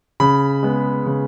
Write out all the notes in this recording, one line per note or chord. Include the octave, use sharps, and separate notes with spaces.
C#3 B5
G#3 B3
C#3